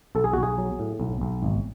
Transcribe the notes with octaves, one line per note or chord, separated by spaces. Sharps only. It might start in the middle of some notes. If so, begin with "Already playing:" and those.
B1 A4
G#4
B1 F#4
G#4
F#3
A2
B1
B1
G#1